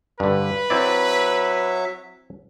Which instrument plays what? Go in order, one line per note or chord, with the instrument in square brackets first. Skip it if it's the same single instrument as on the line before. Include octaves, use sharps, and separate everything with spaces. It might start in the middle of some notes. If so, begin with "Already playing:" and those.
[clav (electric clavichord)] G2 D3 [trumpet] B4
[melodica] F#3 E5 [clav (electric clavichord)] C4 E4 D5